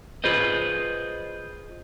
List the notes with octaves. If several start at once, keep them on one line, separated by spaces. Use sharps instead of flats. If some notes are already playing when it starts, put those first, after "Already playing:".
F4 G#4 B4 C5 D#5